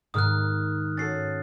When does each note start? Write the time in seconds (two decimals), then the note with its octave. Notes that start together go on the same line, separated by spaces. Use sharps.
0.14 G#2 D#3 D#6 F6 F#6
0.97 C#4 F#4 A4 A6 C7